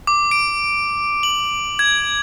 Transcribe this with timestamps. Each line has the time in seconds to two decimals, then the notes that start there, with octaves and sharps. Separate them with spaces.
0.07 D6
0.31 D7
1.23 F#7
1.79 G#6